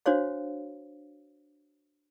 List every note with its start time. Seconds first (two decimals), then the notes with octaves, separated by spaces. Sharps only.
0.06 D4 F#4 C5 C#5 F5